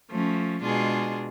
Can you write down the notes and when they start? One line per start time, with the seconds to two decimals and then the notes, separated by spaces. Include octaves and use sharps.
0.10 F3 A3 C#4
0.62 B2 G#3 D4 F4 G#4